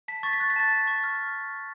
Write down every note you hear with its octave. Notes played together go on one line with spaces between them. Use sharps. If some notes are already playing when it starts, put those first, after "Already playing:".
A5 B6
C#6 A6
B6
F#6 A6
B6
A5 A6
A5
C#6
F6